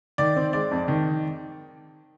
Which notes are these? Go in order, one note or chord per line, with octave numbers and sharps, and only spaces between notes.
D#3 D5
C4
G#3 D5
F2
D#3